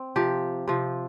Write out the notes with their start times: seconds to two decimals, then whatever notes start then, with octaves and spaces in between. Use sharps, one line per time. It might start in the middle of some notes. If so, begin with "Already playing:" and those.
Already playing: C4
0.16 C3 F3 G4
0.68 C3 F3